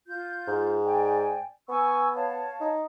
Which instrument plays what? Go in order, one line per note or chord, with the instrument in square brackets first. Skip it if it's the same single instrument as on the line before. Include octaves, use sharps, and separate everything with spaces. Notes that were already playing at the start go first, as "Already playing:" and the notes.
[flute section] F4 G6
[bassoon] G#2
[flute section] D5 G5 G#5
[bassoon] B3 [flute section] G#5 C#6 E6
[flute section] C#5 F5 A5
[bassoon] D#4